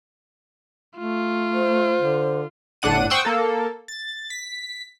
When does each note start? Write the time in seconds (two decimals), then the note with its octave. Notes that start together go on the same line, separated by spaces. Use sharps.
0.99 A3 F4
1.54 C5
2.01 D3
2.82 G1 A2 D4 F#5 D#7
3.10 C5 F#5 G5 C#6 D#6 E6
3.25 A#3 A4
3.88 A6
4.30 B6